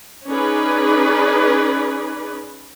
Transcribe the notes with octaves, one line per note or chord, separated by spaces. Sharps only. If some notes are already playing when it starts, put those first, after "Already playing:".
C#4 D#4 G#4 B4 D5